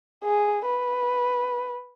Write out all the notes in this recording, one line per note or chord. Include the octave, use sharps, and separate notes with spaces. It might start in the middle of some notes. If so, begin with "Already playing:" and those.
G#4
B4